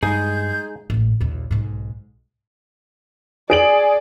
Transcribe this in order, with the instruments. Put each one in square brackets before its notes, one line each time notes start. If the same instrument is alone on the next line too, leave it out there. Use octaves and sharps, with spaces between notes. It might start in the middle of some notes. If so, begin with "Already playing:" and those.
[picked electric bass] G2 G3 [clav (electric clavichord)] G#3 D#4 [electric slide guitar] G#4 [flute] G6
[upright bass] A1 G#2
A#1 D#2
B1 G#2
[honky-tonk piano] G#4 D7 F#7 [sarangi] D5